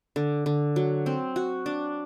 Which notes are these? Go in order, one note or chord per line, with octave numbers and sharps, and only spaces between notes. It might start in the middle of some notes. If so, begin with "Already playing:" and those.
D3
D3
F#3
C4
F#4
D4